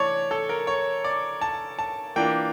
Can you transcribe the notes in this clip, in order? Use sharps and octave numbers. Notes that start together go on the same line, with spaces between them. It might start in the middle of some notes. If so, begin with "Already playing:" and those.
Already playing: E3 A3 C#5 D5 A5
A4
A#4
C#5
D5
A5
A5
E3 A#3 D4 F4 G5